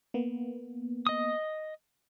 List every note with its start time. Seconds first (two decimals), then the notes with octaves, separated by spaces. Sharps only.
0.14 A#3 B3
1.07 D#5 D#6